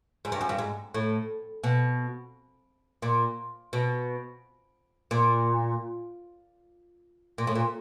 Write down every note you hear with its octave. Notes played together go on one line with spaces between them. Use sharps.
G#2
G2
F#2
G2
G#2
A2
B2
A#2
B2
A#2
A#2
A2
A#2